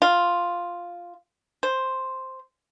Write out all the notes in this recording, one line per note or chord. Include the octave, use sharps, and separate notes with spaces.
F4
C5